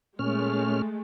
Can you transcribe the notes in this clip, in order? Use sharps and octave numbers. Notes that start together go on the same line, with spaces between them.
A#2 G#3 A3 C#4 F6